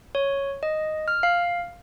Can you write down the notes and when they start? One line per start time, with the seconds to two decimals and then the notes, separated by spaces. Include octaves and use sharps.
0.15 C#5
0.63 D#5
1.08 F6
1.23 F5